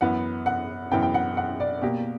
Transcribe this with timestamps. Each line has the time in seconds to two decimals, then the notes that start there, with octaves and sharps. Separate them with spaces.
0.01 F#2 E3 B3 F#5
0.46 F#5
0.92 F#2 E3 B3 G5
1.02 G5
1.14 F#5
1.37 F#5
1.60 D5
1.82 B2 A#3 G4